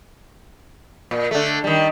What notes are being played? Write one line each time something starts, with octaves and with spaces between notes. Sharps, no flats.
A#2
D3 A3
D#3 G3